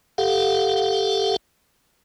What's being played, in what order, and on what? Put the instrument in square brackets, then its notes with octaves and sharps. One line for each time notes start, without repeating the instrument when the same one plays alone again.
[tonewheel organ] G4 A4 F5 F#5